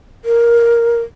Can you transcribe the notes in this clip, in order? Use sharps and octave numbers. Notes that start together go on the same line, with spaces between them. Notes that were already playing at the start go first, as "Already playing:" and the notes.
A#4